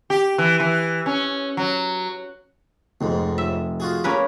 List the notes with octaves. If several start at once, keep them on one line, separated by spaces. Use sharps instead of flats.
G4
E3
E3
C#4
F#3
F1 F2 G#2
E5
F4 F#4 G#4
A#3 C#4 B4